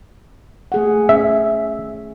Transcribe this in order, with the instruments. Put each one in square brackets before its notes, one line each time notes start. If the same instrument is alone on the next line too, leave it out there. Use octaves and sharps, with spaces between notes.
[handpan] A3 G#4 F#5
[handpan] C#4 [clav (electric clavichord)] E5